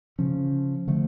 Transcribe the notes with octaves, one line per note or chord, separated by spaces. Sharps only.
C#3 F3 C#4
D3 F3 A3